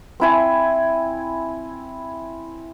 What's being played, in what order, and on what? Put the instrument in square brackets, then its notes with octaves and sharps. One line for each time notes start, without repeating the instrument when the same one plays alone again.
[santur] C4 E4 G#5